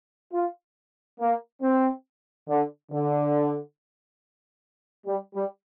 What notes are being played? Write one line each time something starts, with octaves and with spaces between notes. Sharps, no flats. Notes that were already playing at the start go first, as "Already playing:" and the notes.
F4
A#3
C4
D3
D3
G3
G3